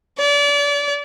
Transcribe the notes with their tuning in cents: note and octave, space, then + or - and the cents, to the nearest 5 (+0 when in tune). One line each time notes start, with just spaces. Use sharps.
D5 -35